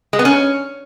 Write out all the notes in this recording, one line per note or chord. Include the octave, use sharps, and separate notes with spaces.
G#3
B3
C#4